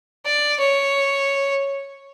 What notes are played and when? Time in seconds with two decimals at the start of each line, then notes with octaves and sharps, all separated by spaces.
0.25 D5
0.59 C#5